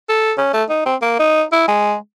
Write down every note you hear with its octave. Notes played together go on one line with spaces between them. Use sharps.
A4
C#4
A3
D#4
C4
A#3
D#4
E4
G#3